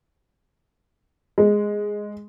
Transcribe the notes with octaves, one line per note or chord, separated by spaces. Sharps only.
G#3